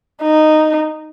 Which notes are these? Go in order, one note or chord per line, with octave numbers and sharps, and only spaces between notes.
D#4